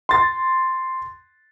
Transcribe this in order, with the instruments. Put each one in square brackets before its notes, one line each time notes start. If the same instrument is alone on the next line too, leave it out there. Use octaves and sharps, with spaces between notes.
[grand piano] C6 A6